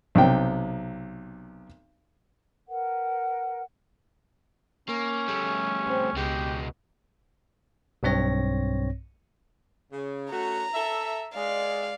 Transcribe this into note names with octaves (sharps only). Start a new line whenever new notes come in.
B1 C3 G5
A#4 B4 F#5
A#3 C#4
G3 A3
C4
C#2 B2 G#3 G4
B1 G2 C4 C#5 A#6
C#3
A3 C#4 F#4 A#5
A4 E5
G#3 D5 F5